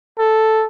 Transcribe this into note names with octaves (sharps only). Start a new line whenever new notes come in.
A4